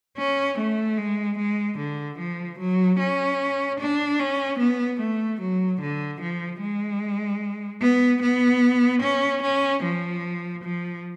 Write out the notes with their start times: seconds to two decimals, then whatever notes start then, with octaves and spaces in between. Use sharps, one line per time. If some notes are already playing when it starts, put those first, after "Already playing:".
0.18 C#4
0.59 A3
0.98 G#3
1.38 G#3
1.78 D3
2.19 F3
2.59 F#3
2.99 C#4
3.80 D4
4.19 C#4
4.59 B3
5.00 A3
5.41 F#3
5.81 D3
6.21 F3
6.61 G#3
7.81 B3
8.22 B3
9.02 C#4
9.43 C#4
9.83 F3
10.64 F3